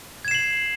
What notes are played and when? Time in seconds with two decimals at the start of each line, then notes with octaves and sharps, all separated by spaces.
0.25 G#6
0.28 E7
0.31 C7
0.35 F#7